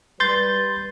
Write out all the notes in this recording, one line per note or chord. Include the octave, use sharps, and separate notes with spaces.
G3 B4 C6 G6 A6